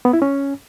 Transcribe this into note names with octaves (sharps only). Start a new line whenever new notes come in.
B3
E4
C#4